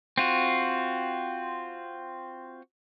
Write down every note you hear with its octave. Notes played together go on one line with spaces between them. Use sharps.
C4 F4 F#4